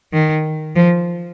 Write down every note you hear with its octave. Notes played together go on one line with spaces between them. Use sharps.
D#3
F3